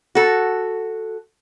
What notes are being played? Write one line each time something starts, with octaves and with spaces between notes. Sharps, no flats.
F#4 A4